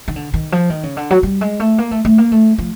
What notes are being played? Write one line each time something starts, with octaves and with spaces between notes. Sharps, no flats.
D#3
D3
D#3
F3
D#3
C#3
D3
F#3
G3
G#3
A3
A#3
A3
A3
A#3
A3
F3